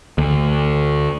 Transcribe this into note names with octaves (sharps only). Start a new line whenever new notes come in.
D2